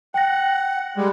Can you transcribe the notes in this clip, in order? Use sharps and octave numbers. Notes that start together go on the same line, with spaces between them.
F#5 G5 A#6
G3 G#3